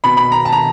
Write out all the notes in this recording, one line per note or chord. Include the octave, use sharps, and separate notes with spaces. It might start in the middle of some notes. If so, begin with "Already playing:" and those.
B2 B5
B5
A#5
A5
A#5